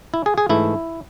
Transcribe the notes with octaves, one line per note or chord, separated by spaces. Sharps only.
E4
G#4
G#4
G#2 E3 A3 E4